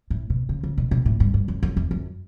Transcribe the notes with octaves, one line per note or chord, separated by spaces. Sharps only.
A2
B2
C#3
C#3
B2
B2
A2
G2
G2
F#2
F#2
E2
F#2